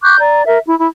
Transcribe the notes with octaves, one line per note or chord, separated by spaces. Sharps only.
C#6 D6 F#6 G6
D5 A#5
A#4 E5
E4
E4